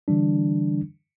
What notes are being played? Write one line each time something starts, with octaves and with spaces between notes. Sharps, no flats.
D3 E3 G3 D4